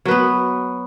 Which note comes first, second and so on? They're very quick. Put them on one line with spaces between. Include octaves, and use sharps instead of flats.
F#3 B4 B3